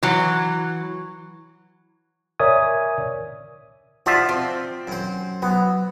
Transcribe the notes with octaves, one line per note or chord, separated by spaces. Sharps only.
E3 F#3
A#4 C#5 D5 E5 G#5 D#6
F3 F4 F#4 D5 E5
C4
F#2 C5
F#3 B3